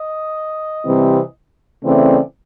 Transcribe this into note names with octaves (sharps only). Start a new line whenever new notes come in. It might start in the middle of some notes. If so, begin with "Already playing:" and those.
Already playing: D#5
C3 E3 G3 C4
C#3 E3 A3 C4 D5